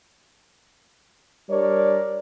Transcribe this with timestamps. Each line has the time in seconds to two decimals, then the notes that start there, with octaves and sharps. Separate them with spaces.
1.49 G3 D4 A#4 C#5 D5